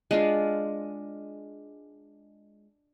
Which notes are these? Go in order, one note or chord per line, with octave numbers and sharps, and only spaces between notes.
G#3 D4 F4